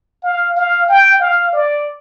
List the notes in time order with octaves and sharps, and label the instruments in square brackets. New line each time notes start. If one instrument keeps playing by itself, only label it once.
[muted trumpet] F5
F5
G5
F5
D5